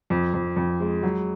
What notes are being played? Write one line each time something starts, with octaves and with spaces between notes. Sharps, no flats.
F2
F2
F2
G#3
F#3